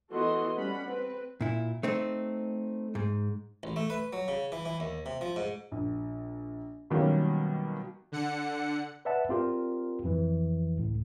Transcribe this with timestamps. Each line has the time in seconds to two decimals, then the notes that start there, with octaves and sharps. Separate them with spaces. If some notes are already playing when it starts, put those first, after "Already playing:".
0.11 E3 B3 F#4 A4 D#5 C6
0.57 G3 C#4 F#5 B5
0.88 C4 B4
1.41 A#2 E4
1.83 A3 C4 D#4
2.95 G#2
3.63 A1
3.76 A3
3.90 B4
4.13 F#3
4.28 C#3
4.52 E3
4.66 E3
4.80 D#2
5.06 C3
5.21 F3
5.36 G#2
5.72 A#1
6.90 B2 D#3 F#3 G3 A#3 C#4
8.12 D3 F#5 C#7
9.05 B4 D5 E5 F#5 A5
9.29 C4 F4 G4 A#4 D5
10.04 F2 E3 F3
10.77 C#2 A2